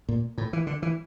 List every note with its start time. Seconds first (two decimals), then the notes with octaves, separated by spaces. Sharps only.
0.09 A#2
0.38 A2
0.53 E3
0.67 D3
0.82 E3